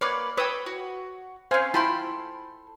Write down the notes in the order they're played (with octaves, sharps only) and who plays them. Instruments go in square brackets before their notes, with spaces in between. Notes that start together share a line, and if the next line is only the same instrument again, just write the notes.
[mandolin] A#3 B4 D5 [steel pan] C#5
[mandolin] B4 G5 [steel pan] C#5 D#6 E6
[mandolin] F#4
[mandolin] C4 C#4 [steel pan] C5 F5 G#5
[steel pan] E4 F4 G5 [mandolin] A4 B5 C6